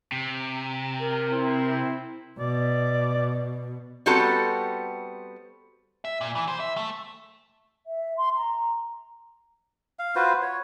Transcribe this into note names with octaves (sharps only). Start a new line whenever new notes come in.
C3
A#4
C4 E4
B2 D5
G3 B3 C4 F#4 A4 A5
E5
A#2
E3
C5
E5
A3
E5
C6
A#5
F5
F4 F#4 B4 C5
C#5